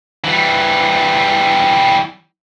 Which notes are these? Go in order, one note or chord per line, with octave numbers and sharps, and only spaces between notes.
E3 G3